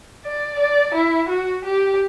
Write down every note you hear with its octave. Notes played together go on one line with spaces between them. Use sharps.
D5
D5
E4
F#4
G4